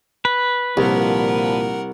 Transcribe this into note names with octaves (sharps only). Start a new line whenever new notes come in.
B4
C2 A#2 D3 F3 A#4 F#5